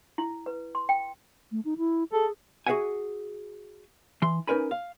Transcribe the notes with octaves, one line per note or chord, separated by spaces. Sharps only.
E4
B4
C6
G5
A3
D#4
E4
G#4 A4
F#4 G#4 C5 E5 F#5 G#5
E3 C6
C#4 D#4 A#4 B4 G#5 B5
F5